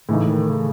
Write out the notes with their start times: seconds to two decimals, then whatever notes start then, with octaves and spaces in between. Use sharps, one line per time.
0.08 A2 C#3 E3 A3 D#4
0.29 D#3
0.50 C#3